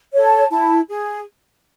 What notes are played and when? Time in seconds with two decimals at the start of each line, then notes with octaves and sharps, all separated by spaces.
0.12 A4 C#5
0.24 A5
0.50 E4 A5
0.90 G#4